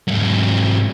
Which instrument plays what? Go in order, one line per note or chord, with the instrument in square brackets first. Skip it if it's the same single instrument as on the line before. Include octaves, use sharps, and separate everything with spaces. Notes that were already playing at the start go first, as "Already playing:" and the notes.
[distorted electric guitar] G#2 F#3